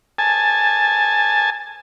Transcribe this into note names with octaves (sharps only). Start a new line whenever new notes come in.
G#5 A5